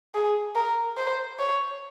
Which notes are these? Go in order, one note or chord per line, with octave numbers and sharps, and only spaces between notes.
G#4
A#4
C5
C#5